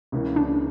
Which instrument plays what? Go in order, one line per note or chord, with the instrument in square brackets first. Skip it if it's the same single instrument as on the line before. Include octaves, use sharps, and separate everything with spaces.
[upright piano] C#2 C#3 E3 A#3
[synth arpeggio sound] D4